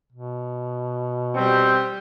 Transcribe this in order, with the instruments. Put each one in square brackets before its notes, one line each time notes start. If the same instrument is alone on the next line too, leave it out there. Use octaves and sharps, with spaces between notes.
[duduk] B2
[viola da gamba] G3 G4 [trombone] C4